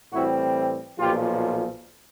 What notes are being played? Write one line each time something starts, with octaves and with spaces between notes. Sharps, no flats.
A2 E3 G3 C4 E4 F#4
B1 A#2 F3 F4 G4